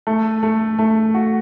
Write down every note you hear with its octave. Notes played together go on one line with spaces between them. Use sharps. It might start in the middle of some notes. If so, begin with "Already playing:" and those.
A3
A3
A3
F#4